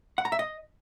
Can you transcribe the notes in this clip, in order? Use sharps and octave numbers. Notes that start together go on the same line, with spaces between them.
F#5
A#5
E5
D#5